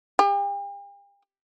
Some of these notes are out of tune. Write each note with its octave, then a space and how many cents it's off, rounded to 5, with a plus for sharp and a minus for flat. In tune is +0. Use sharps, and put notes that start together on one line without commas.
G4 +40